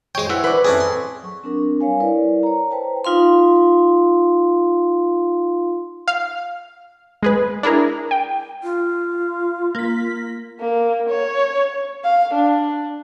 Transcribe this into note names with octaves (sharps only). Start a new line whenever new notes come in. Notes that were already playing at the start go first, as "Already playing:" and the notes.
G#3 C5 C#5 G5
E3 E5 F#5
B4 D5
C4 C#4 E4 G#4 A4
C6
F#3 C#6
C4 D4 A#4
G3 C#5 F5 G#5
E4 A#4 B4 D5
C#5 A#5
B4 C5 G5 A5
D#4 F4 F5 C6
F5
G#3 G#4 B4
D4 E4 G#4 A#4
G5
F4
A#3 B6
A#3
C#5
F5
D4